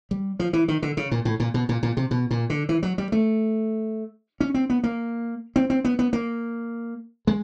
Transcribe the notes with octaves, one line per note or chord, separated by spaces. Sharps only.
G3
F3
E3
D#3
D3
C#3
A#2
A2
A#2
B2
A#2
A#2
C3
B2
A#2
D3
E3
F#3
G3
A3
C#4
C4
B3
A#3
C4
C4
B3
B3
A#3
G#3